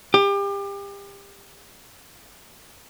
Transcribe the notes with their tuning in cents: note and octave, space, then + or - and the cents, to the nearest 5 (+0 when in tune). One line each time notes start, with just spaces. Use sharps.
G4 +30